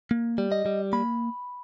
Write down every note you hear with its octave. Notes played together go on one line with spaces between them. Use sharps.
A#3
G3
D#5
G3
A#3 B5